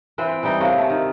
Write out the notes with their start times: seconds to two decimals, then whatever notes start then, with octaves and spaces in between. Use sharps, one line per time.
0.18 E3 C4 B4
0.43 E3 G3 D#4 G5
0.60 C3 A3 A#3 C#5
0.78 A3
0.90 D#3